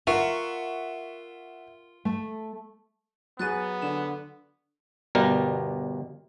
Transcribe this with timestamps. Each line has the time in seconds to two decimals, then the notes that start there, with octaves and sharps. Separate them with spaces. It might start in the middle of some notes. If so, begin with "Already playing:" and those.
0.07 F4 A#4 E5 F#5 C#6
2.05 A3
3.39 F#3 B3 G#4 F#6 A6 D#7
3.82 D3 E7
5.15 G1 B2 G3 A#4